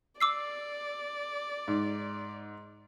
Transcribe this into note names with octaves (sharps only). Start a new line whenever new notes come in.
D5 D6 E6 C7
G#2